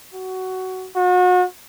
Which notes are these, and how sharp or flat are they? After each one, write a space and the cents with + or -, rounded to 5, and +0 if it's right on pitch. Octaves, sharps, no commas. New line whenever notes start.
F#4 +15
F#4 -35